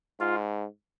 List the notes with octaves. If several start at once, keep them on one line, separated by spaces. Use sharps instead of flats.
G#2 F4